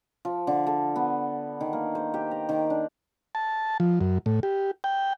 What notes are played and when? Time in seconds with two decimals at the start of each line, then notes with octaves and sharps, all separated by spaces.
0.25 F3
0.47 D3
0.67 A4
0.96 B3
1.61 D#3
1.73 A#3
1.95 C5
2.14 G4
2.31 A#5
2.49 D#3
2.70 D4
3.35 A5
3.80 F3
4.01 F#2
4.26 A2
4.43 G4
4.84 G5